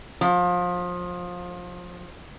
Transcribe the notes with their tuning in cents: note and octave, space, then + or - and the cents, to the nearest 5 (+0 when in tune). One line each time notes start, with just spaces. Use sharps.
F3 +25